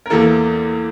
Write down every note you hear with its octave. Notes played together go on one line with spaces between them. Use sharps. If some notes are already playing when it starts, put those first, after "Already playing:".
A#4
E2 E3 A#3 A4